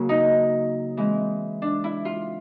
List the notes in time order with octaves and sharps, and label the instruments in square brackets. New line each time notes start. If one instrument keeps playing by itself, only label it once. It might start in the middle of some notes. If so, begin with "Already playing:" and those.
Already playing: [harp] C#3 F#3 A#3 C#4
D#4
E3 G#3 C4
D4
E4
F4